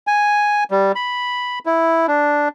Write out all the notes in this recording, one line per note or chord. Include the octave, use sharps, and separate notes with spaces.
G#5
G3
B5
E4
D4